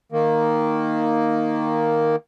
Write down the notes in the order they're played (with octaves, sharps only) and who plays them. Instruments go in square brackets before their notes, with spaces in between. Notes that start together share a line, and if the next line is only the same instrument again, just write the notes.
[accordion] D#3 A#3